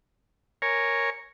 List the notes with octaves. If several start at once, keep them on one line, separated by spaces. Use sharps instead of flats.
A#4 C#5 G#5